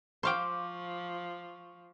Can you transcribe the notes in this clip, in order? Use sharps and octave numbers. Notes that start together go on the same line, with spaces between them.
F3 C5 F5 G5 C#6 D6